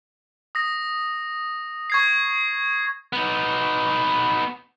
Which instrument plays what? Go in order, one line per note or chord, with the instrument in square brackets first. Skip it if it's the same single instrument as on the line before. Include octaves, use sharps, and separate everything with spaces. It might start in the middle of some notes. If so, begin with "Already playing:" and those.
[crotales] D#6 A#6
C#6 G#6 C7
[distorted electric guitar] B3 D#4